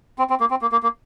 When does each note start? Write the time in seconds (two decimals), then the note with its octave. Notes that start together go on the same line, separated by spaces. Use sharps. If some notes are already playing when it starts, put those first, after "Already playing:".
0.19 C4
0.30 C4
0.40 A#3
0.50 C4
0.62 A#3
0.72 A#3
0.83 A#3